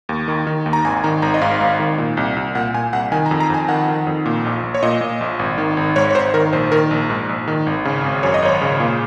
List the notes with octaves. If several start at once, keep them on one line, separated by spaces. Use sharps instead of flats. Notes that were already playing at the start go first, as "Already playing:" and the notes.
D#2
D#3
D#3
D#2
A#5
G#1 G#5
D#3 A#5
G#1 A#5
D#5
G#2 F5
G#1
D#3
A#2
C2
C2
A#2 F#5
A#2 G#5
C2 F#5
D#3 G#5
A#5
F2
A#5
F2 G#5
D#3 F#5
D#3
F2
A#2
A#1
A#1
C#5
A#2 D#5
A#2
A#1
G#1
D#3
G#1
G#2 C#5
C#5
G#1 C5
D#3 A#4
A#1 C5
D#3 A#4
A#1
G#2
A#1
D#3
G#1
C#3
G#1
F#2 C#5
D#5
G#1 C#5
C#3
A#2